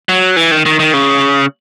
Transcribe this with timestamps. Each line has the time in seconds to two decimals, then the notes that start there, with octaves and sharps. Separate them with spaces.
0.09 F#3
0.37 E3
0.51 D#3
0.66 D#3
0.79 D#3
0.93 C#3